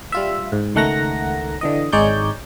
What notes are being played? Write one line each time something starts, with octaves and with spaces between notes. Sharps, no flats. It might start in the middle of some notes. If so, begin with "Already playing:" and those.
G3 F4 E5
G#2
C#2 D#3 A3 F#5 A#5 A#6
D3 E3 D#5
G#1 G#3 D#4 C#5 D5 G6